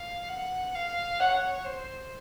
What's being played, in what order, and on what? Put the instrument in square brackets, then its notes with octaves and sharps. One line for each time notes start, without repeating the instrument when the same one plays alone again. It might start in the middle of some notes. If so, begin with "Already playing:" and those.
Already playing: [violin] F5
F#5
F5
[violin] C#5 [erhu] F#5
[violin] C5